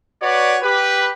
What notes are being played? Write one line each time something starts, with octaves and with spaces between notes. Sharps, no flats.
F#4 B4 C#5 D5
G4 B4